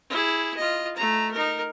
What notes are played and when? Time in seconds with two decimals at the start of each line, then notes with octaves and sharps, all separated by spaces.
0.10 E4 G#4
0.57 F4 D#5
0.96 A3 A#5
1.32 D#4 A#4